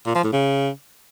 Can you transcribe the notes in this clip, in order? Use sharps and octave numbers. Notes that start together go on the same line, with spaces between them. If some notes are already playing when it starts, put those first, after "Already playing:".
A#2
F3
A2
C#3